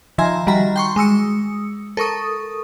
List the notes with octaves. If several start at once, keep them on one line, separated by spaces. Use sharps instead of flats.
D#3 F3 E5 G#5 A#5 C6
D#3 G3 F#4 A#5 B5
G5 C6 C#6
G#3 D#6 E6 C#7
A4 A#4 C#6 D#6